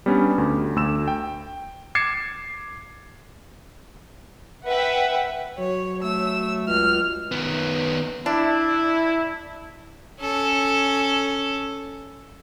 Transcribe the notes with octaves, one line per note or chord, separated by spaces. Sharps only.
G3 B3 C#4 D4
D2
D2 E6 E7
G5
D6 G#6 A6 C7 C#7 E7
B4 E5 F#5 G5
F#3 C#5
A3 E6
C#2 F6
D#3 B3
D4 E4
C#4 A4